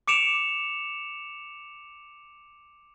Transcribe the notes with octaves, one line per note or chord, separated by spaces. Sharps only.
D6 C#7 D7 E7 F7